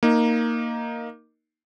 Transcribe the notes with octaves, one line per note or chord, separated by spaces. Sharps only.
A#3 D#4